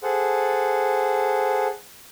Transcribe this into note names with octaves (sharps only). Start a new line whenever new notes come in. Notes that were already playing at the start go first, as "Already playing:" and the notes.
G#4 A4 C5 F#5